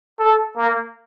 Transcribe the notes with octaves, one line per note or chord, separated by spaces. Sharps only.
A4
A#3